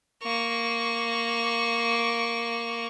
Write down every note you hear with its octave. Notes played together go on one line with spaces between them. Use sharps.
A#3 C#6